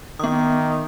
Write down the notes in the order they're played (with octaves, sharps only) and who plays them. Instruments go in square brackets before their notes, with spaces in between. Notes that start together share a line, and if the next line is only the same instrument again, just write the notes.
[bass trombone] D#3 [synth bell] B3 D#6